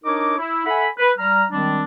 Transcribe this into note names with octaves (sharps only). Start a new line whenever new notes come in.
D4 D#4 A#4 C#5 D#5 D6
E4
A4 E5 F#5 G#5 B5
B4
G3 A#5 F6
D#3 G3 G#3 C4 D4